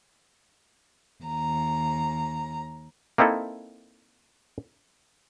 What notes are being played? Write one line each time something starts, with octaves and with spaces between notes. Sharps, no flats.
D#2 A#5
A#3 C4 D#4 E4 A4